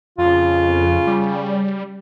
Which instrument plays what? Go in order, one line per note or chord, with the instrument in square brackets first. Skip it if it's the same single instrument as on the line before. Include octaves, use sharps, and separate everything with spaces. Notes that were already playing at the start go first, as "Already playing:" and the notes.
[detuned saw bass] F2 [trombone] C#3 [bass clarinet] F4
[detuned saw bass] G3